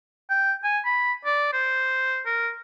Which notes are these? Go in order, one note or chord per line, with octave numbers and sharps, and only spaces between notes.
G5
G#5
B5
D5
C5
A#4